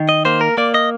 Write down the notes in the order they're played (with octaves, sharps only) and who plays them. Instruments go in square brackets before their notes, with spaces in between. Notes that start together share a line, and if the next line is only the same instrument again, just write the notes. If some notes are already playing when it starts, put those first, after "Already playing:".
Already playing: [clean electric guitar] D#3
D#5
A#3 C5
A#4
A#3 D5
D#5